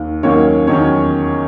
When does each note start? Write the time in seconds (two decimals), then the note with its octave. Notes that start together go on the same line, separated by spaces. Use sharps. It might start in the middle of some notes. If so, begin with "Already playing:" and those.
Already playing: D#2
0.23 D#2 D#3 F#3 A#3 C#4 C#5
0.67 E2 D#3 F#3 C#4 C#5